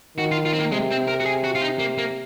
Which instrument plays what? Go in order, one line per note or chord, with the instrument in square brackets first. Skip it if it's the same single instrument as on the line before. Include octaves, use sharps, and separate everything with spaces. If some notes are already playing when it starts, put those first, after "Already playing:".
[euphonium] D#3 [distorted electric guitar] F#4
[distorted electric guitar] F4
F4
C4
A#3
[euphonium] C3 [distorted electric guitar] G#3
[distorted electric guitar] C4
A#4
F#4
G#4
F#4
F4
D#4
A#3
A#3